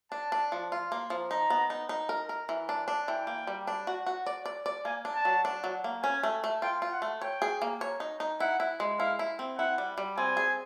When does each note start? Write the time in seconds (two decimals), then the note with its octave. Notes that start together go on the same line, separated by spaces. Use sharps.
0.12 D4 A5
0.32 D4
0.52 F3
0.72 F4
0.92 A#3
1.10 F3
1.31 D#4 A#5
1.50 B3
1.70 D#4
1.89 D#4
2.09 A#4
2.29 A#4
2.49 E3
2.69 D4
2.88 D4
3.08 E3 G5
3.27 A#3
3.47 G3
3.67 D4
3.87 F#4
4.06 F#4
4.26 D5
4.46 D5
4.66 D5
4.85 A#3 G#5
5.05 D4
5.15 A5
5.25 F#3
5.45 D4
5.64 F#3
5.84 A#3
6.03 C#4 G#5
6.23 A3
6.44 A3
6.62 F4 G5
6.82 F4
6.92 F#5
7.02 A3
7.21 C#5 G5
7.42 G#4
7.62 A#3
7.81 C#5
8.00 D#4
8.20 D#4
8.40 E4 F#5
8.60 E4
8.80 G#3
8.99 E4 F5
9.19 E4
9.39 C4
9.58 E4 F#5
9.78 G3
9.98 G3
10.18 C4 G#5
10.37 G#4